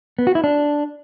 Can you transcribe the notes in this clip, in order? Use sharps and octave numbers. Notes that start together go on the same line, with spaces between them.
B3
F#4
E4
D4